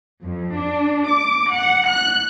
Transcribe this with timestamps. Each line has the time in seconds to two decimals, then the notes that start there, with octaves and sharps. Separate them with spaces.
0.23 F2
0.57 D4
1.08 D6
1.54 F#5
1.90 F#6